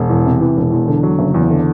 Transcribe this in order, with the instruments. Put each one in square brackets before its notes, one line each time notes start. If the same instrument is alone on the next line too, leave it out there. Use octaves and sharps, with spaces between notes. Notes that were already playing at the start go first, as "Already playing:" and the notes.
Already playing: [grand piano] E1
E2
C3
E3
E1
E2
D3
F#3
F#1
E2
D3